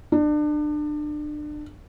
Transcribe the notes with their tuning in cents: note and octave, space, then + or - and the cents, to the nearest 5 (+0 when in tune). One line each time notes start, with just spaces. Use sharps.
D4 +30